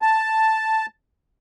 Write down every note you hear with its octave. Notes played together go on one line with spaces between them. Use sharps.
A5